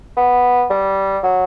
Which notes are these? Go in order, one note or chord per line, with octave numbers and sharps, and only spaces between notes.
B3
G3
F#3